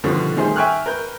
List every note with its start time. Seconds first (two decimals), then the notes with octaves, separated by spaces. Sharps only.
0.04 B2 D3 D#3 F3 G3
0.37 D#3 G3 A3 D#4 G#4 C5
0.56 E5 G5 G#5 C#6 F6 F#6
0.86 A#4 B4 G6